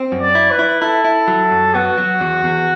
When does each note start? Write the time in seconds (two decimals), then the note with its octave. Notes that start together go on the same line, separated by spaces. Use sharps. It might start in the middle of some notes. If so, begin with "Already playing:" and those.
Already playing: C4
0.12 F#2
0.21 D5
0.35 E4
0.51 B4
0.59 E4
0.82 E4 A4
1.04 E4
1.28 F#3
1.51 F#2
1.74 B3 F#4
1.98 F#3
2.20 E2
2.44 E2